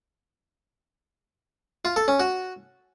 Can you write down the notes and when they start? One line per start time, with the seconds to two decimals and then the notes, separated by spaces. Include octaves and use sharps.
1.85 F4
1.96 A4
2.08 C#4
2.20 F#4